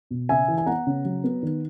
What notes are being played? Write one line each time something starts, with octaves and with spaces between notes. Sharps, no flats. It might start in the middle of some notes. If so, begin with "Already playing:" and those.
B2
C#3 E5 G#5
E3
G#5
B3 F#5 A#5
C#3
F#3
B3
D#3